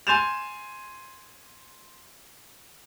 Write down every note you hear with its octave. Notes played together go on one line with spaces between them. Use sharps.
G#5 C6 G6 A6 E7 F7